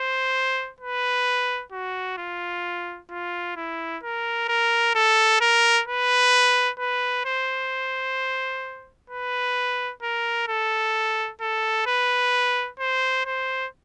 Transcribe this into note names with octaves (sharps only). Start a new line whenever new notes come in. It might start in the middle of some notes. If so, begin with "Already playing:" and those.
Already playing: C5
B4
F#4
F4
F4
E4
A#4
A#4
A4
A#4
B4
B4
C5
B4
A#4
A4
A4
B4
C5
C5